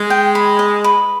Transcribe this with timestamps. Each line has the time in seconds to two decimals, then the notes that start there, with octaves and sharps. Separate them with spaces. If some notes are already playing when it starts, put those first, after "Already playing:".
Already playing: G#3
0.10 G5
0.35 B5
0.59 D#5
0.84 B4